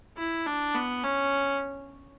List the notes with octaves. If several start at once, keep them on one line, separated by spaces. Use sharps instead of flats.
E4
D4
B3
C#4